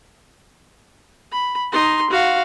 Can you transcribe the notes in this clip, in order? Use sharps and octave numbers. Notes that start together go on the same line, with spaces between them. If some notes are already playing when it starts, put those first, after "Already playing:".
B5
D#4 C6
F#4 F5